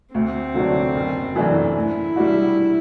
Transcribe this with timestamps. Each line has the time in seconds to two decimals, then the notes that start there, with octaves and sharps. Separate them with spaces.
0.14 D2 C4
0.54 D3 F#3 A3 D4
0.95 F#1
1.36 F#2 E3 A3 D4
1.75 A2 E4
2.16 G3 D4 F#4